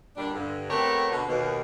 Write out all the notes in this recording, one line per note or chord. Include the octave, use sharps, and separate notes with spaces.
A#2 D3 G3 D4
G2 D3
A3 B3 C4 G4 A#4 C#5
B2 D3
D#2 B2